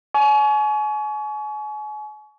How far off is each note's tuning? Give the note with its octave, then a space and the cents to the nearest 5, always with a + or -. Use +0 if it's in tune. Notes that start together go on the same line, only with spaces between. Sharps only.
G#5 +35 C#6 +30